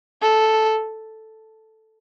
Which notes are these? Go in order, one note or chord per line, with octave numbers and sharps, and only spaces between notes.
A4